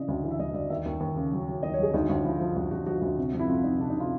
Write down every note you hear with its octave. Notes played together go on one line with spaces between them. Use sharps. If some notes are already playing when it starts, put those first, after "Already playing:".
Already playing: C#3 E3 D5 D#5
D2
E3
E5
D2 D#5
D2 D5
D#2 E5
D#2
D#2
C#3
F#3
F#3
D#2 D#5
C#5
F#3 G#4
D2 D#4
D2 F4
F3 E4
F3
D2 F#4
D2 F#4
F3 F#4
D2
C3
F2
E4
F2 F4
F2 D#4
C3 D4
D#4
C3
F4